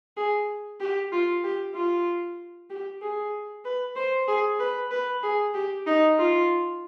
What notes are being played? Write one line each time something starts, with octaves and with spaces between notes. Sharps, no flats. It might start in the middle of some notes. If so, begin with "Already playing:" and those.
G#4
G4
F4
G4
F4
G4
G#4
B4
C5
G#4
B4
B4
G#4
G4
D#4
F4